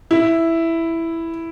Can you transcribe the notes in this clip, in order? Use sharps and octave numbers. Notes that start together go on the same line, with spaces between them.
E4